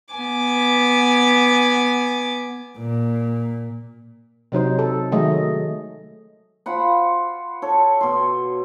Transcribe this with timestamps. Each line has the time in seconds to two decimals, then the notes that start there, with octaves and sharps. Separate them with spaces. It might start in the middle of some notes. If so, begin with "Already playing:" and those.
0.14 B3 G#5 D6
2.77 A#2
4.52 C3 F#3 D#4 C5
4.79 A4
5.12 D#3 F#3 G#3 A3 D#5
6.66 F4 C5 F#5 B5
7.62 A4 C#5
8.01 B2 C6